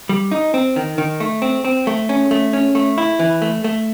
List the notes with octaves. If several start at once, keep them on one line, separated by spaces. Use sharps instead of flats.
G3
D#4
C4
D#3
D#3
A3
C4
C4
A3
C#4
A3
C#4
A3
E4
E3
A3
A3